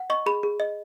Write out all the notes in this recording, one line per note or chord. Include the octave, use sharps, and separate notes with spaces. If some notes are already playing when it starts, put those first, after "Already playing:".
Already playing: F#5
D#5 C#6
G#4 B5
G#4
D#5